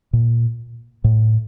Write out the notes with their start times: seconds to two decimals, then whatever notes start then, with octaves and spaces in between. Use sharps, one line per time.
0.13 A#2
1.04 A2